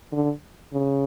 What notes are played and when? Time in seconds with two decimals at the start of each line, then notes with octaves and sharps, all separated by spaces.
0.13 D3
0.73 C#3